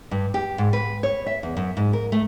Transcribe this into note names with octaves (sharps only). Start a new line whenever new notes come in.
G2
G4
G#2
B4
C#5
E5
E2
F#2
G#2
A#4
A3